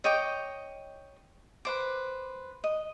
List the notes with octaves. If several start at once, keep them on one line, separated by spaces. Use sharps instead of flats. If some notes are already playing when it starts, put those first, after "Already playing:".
C#5 D#5 G5 D6
B4 C5 D6
D#5